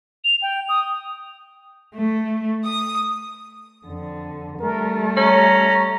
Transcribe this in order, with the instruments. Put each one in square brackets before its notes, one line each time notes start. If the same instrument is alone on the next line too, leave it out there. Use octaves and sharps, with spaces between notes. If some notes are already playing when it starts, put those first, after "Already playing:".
[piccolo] F7
G5
D#6
[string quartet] A3
D#6
[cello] F2 D3
[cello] G3 A3 [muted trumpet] A#4
[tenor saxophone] C#4 [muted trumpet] A#5